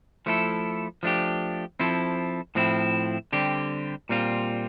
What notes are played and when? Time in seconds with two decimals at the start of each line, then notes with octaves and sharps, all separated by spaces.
0.26 F3 A3 E4 A4
1.03 F3 A3 D4 G4
1.79 F3 C4 E4 A4
2.55 A2 F3 C4 E4
3.32 D3 G3 C4 G4
4.09 A#2 G3 C4 F4